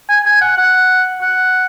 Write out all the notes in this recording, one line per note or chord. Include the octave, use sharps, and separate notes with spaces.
G#5
G#5
F#5
F#5
F#5